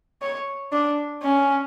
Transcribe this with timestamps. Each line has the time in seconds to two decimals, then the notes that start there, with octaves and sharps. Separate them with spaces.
0.22 C#5
0.72 D4
1.23 C#4